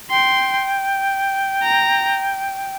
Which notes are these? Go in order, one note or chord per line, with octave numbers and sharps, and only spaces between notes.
G5 C6
A#5